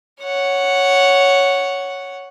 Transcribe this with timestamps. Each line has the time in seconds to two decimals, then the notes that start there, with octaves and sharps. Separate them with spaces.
0.21 C#5 F#5